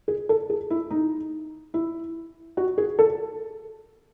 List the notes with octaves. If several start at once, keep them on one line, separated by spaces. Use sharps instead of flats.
G#4
A4
G#4
E4
D#4
E4
F#4
G#4
A4